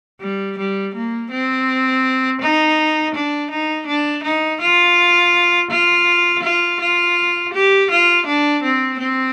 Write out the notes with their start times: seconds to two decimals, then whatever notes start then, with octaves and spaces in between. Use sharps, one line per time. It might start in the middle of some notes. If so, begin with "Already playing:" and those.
0.21 G3
0.58 G3
0.95 A#3
1.31 C4
2.41 D#4
3.15 D4
3.51 D#4
3.87 D4
4.23 D#4
4.61 F4
5.71 F4
6.43 F4
6.80 F4
7.53 G4
7.91 F4
8.26 D4
8.63 C4
8.99 C4